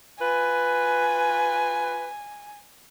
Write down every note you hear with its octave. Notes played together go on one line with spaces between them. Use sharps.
F4 B4 G#5